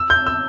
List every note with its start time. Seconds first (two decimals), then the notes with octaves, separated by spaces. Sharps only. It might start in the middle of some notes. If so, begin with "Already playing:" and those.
Already playing: E6
0.10 G6
0.27 E6